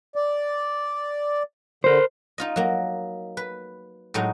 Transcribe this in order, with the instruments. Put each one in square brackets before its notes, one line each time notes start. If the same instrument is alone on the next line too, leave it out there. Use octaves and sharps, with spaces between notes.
[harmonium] D5
[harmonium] D3 [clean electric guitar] A#4 C5
[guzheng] D#4 F4 D#5
F#3 A#3
B4
A2 F#3 G#3 D#4